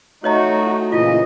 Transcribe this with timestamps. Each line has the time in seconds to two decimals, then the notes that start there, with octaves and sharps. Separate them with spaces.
0.24 A3 D#4 F#4 C#5 D#5 A#5
0.92 A#2 C#3 E3 E4 F4 D#5